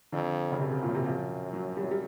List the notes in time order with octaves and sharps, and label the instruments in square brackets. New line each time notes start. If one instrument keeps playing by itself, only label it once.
[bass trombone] F2 [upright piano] D3
[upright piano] C#3
[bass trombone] F#2 [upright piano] C3
[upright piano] C3
A#2
C#3
C3
F3
F#3
G3
F#3
G3